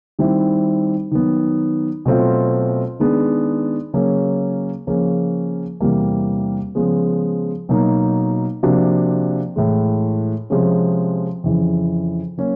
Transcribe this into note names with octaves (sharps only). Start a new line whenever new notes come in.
D#3 G3 C4 E4
D#3 F#3 B3
B2 F#3 A3 C4 F4
D#3 G#3 B3 D4
C#3 F#3 A#3 C#4
C#3 F3 A#3 C#4
E2 C3 E3 G3 A#3
C#3 F3 G#3 B3
B2 F#3 A#3 D#4
C3 F3 A#3 D4 F#4
A2 E3 G#3
C3 F3 G#3 C#4
F2 C#3 E3
F#3 A#3 C#4